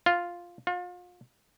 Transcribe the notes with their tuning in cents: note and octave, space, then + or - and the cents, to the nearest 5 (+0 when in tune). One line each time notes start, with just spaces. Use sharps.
F4 +0
F4 +35